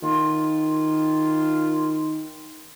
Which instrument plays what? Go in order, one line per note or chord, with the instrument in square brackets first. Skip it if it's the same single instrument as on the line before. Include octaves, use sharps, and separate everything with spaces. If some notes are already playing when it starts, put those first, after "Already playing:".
[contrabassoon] D#3 [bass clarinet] F4